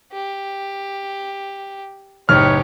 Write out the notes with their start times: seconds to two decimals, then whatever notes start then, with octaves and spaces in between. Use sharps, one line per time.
0.12 G4
2.29 F#1 A2 C4 D#4 G4 B4 C#5 F6